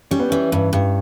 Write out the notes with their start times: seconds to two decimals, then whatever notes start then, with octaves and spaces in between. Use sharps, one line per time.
0.11 G3 C#4
0.20 B3
0.29 E3 C#4
0.52 G2
0.73 G2